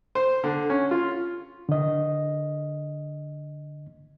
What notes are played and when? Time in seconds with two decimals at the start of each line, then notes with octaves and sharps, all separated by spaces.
0.15 C5
0.44 D3
0.70 C#4
0.91 F4
1.69 D3 D#5